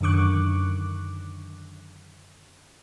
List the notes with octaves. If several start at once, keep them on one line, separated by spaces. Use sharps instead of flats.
F#2 D3 D#3 C#6 D6 F#6